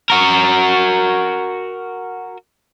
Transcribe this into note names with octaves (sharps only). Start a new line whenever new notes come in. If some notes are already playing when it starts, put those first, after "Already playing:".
F#4 A#4